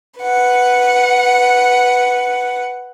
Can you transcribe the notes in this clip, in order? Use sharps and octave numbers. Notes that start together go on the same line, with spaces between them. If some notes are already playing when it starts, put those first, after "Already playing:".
B4 F#5